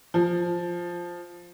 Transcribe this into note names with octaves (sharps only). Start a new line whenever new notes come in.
F3